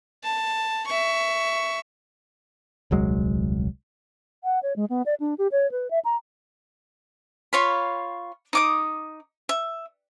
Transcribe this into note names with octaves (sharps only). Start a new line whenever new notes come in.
A5
E5 C#6
D#1 C2 F#3 G#3
F#5
C#5
G#3
B3
D5
D4
G4
C#5
B4
E5
A#5
F4 C#5 F5 B5
D#4 D6 D#6
E5